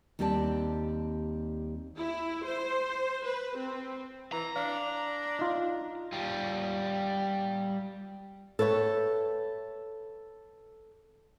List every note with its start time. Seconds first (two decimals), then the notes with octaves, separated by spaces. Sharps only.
0.19 D#2 G3 C4 G4 D5 A5
1.97 E4
2.45 C5
3.25 B4
3.56 C4
4.32 E3 A#5
4.56 D4 F5
5.39 D#4 F4
6.12 G3 F4
8.59 A4 B4 C#5 E5 G5